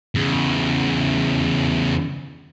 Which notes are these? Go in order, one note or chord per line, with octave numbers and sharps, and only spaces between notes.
E2 C#3